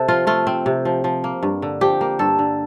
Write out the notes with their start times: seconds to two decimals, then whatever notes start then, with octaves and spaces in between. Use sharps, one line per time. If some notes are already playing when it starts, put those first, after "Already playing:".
Already playing: C3 C4 A4
0.08 F3 F4
0.27 A3 F4
0.47 C4
0.66 C3
0.85 F3
1.04 F3
1.24 A#3
1.43 G2
1.62 D3
1.81 F3 G4
2.01 A#3
2.19 G2 A4
2.39 D3